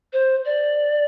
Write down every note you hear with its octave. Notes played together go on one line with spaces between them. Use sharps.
C5
D5